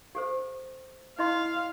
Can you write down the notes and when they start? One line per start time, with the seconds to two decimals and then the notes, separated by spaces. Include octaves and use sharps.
0.15 G4 A4 C5
1.19 E4 D#5 F5 C6